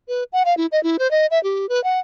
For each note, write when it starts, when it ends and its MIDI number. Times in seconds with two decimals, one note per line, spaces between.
0.08 0.23 71
0.33 0.43 78
0.45 0.54 77
0.57 0.66 64
0.72 0.82 75
0.83 0.97 64
0.99 1.10 72
1.11 1.26 75
1.31 1.42 76
1.43 1.69 67
1.69 1.83 71
1.84 1.99 78